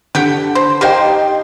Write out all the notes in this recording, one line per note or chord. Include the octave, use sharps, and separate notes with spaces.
D3 G4 F#5 G5
C5
D#3 A#3 G4 C5 D#5 G5